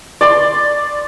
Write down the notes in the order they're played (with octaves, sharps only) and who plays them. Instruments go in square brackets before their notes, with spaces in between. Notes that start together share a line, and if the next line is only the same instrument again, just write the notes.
[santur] D5 C6